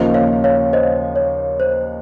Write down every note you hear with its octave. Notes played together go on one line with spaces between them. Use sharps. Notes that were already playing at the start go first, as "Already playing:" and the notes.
Already playing: D#2 C#3 F3 A#3 D#4 C5
C#5 F5
C#5 F5
C5 D#5
C#5
C5